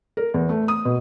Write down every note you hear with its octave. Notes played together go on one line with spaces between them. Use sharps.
A#4
E2
A3
D#6
B2